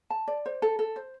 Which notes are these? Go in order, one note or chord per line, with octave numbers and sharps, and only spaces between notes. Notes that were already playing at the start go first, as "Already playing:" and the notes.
A5
D5
C5
A4
A4
C5